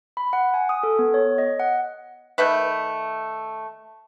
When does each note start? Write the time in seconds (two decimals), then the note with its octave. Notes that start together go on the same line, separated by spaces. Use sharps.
0.17 B5
0.33 F#5
0.54 G#5
0.69 D#6
0.83 A4
0.99 B3
1.14 C#5
1.38 D#5
1.60 F#5
2.38 D#3 A3 B4